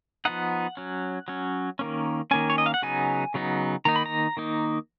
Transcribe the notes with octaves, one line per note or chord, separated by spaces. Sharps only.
F3 B3 D#4 F#5
F#3 C#4
F#3 C#4
D#3 A#3 C#4
D#3 A#3 C#4 G#5
C#5
D#5
F5
F#5
C#3 F#3 B3 D#4 G#5
C#3 F#3 B3 D#4
D#3 A#3 D#4 A#5
B5
A#5
D#3 A#3 D#4